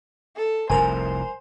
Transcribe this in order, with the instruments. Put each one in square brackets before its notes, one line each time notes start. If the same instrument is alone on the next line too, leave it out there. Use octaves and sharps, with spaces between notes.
[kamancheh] A4
[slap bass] F1 C2 F2 [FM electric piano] A#4 G#5 [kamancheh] C5